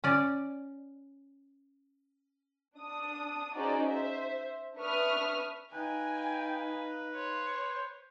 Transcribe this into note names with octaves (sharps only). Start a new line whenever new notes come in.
C#4 D5
D4 D#6
C#4 D#4 F#4 G#4 C5 D5
C5 E5
D4 B4 E5 C#6 D#6 F6
D#4 B4 F5 G5 G#5
C5 C#5